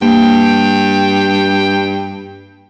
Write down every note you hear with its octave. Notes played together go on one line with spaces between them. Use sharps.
G2 A#3 G5